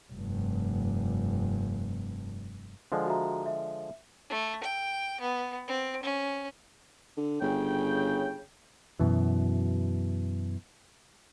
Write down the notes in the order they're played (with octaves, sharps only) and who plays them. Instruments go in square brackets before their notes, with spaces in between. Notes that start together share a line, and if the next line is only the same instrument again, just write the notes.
[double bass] F1 G2
[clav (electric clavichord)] D3 F3 G#3
[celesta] F#4 E5 A#5
E5
[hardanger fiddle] A3
G5
B3
C4
C#4
[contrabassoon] D3
[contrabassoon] G1 [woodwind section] C#3 G5
[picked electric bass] F#2 B2 E3